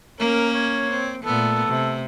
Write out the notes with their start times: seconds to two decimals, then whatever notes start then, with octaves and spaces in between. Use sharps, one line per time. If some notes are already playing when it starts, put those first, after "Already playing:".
0.20 A#3 C#4 A#4
0.53 C#5
0.91 C4
1.24 A#2 A3 B3 A4
1.68 C3